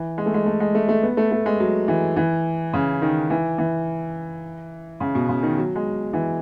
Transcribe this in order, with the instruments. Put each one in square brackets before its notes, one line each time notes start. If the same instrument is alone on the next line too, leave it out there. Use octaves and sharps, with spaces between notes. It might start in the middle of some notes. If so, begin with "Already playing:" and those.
Already playing: [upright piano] E3
G#3
A3
G#3
A3
G#3
A3
A3
B3
A3
A3
G#3
F#3
E3
E3
C#3
D#3
E3
E3
C#3
B2
C#3
D#3
F#3
G#3
E3